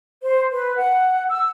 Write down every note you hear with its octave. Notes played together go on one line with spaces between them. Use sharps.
C5
B4
F#5
E6